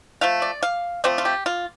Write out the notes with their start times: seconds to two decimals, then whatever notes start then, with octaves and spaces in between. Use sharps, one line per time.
0.21 F3 A3 F5
0.42 D5
0.63 F5
1.04 F3 A3 C4 D5
1.18 F4
1.25 G4
1.46 F4